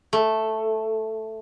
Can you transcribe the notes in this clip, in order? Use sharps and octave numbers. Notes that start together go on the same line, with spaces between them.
A3